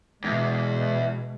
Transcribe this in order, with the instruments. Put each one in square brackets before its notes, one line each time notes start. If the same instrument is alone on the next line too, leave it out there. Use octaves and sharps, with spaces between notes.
[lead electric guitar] E2 [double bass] B2 G#3